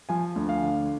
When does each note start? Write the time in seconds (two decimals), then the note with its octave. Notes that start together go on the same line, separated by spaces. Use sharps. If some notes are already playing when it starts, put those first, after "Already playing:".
0.09 F3 G#5
0.36 D2
0.49 F5
0.63 D3